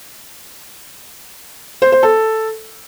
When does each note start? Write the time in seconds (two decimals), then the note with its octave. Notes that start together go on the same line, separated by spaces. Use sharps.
1.82 C5
1.92 C5
2.03 A4